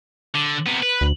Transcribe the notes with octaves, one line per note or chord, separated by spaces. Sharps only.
D3
C3 B3
B4
D2